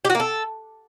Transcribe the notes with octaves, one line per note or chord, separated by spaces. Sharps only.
G4
F#4
A#3
A4